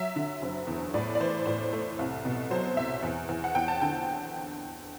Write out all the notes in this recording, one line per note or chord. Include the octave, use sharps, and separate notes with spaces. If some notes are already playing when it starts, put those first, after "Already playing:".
Already playing: F#3 E5
D3
F#1
E2
A2 D5
D5
E3 C5
A2 C5
A3
C2
B2
F#3 C5
C2 E5
E2
E2
F#5
E2 G5
A5
D3 G5